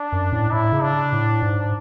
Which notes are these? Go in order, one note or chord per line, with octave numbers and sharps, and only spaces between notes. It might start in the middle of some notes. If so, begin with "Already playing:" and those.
Already playing: D4
F#2
A2
A2 E4
C#3
D4
A2
G#2